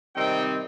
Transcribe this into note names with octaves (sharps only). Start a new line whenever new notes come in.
C3 D#3 G3 C4 D#4 G5